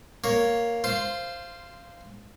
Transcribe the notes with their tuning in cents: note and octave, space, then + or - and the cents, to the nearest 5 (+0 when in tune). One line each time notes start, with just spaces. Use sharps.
A#3 +0 C#5 +0
F4 -15 C5 +0